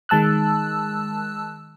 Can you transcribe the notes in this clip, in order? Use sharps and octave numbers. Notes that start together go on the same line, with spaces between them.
D#3 G#3 A5 E6 F#6